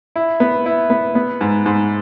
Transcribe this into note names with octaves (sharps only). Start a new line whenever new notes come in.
E4
B3
E4
B3
B3
G#2
G#2